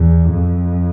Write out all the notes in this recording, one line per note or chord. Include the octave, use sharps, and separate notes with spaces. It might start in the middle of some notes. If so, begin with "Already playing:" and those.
Already playing: E2
F2